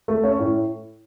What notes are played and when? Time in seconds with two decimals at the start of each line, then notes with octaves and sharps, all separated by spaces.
0.08 A3
0.24 C#4
0.39 A2